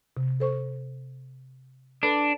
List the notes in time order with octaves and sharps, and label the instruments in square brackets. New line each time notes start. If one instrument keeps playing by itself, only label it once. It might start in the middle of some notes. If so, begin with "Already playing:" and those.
[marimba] C3
A4 C5 C#6
[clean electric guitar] D4 [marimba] A4 B4 B5